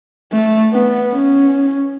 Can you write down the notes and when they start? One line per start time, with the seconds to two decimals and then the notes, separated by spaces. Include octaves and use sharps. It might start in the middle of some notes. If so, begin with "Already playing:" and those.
0.32 A3
0.73 B3
1.13 C#4